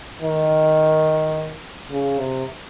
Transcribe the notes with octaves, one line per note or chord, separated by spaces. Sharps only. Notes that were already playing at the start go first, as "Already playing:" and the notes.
D#3
C#3
C3